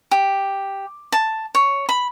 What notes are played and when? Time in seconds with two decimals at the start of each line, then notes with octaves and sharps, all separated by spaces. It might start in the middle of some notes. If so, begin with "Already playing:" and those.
0.11 G4
1.12 A5
1.55 C#5
1.89 B5